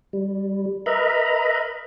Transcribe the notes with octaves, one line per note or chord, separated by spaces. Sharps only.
G3
A#4 B4 D#5 E5 A#5 B5